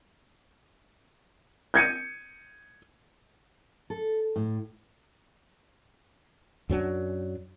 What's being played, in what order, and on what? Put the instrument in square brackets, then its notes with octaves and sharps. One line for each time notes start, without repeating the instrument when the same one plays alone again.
[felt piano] G6 G#6 C#7 D#7
[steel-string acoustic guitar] A4
A2
[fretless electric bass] F#2 F#3 C4 D4